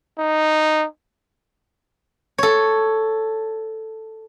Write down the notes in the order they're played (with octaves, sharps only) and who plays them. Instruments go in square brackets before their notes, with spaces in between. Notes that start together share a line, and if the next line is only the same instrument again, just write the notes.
[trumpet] D#4
[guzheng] A4 C#5